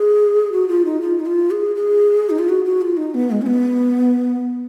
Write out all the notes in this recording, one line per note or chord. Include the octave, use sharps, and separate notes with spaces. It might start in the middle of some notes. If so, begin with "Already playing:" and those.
Already playing: G#4
F#4
F4
D#4
F4
D#4
F4
G#4
G#4
D#4
F4
F#4
F#4
F4
D#4
B3
G#3
C#4
B3